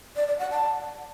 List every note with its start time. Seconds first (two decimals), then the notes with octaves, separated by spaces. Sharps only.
0.16 D5
0.28 D5
0.39 F#5
0.51 A5